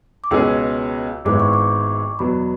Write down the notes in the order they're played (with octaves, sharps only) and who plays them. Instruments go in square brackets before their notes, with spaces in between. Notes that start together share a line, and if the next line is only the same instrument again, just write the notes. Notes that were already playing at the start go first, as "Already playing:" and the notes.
[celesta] D6
[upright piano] C#2 B2 G#3 C#4 G#4 [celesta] E6
[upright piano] G#1 G#2 G#3 B3 E4 [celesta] D6
[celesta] C#6
D6
[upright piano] E2 B2 F#3 [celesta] B5